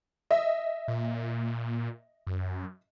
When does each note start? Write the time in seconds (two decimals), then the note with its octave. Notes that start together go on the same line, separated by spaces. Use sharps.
0.31 D#5 E5
0.88 A#2
2.27 F#2